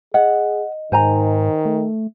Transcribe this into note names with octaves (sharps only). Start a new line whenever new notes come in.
G#4 D#5 F#5
G#2 D#3 C5 G#5 A#5
A3